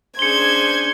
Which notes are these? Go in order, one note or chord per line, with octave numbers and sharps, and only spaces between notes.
C#4 D4 G#4 C5 G#6 C#7 G7